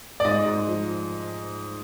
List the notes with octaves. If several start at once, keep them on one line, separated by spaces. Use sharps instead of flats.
D5
G#2 D#5
G#2
F3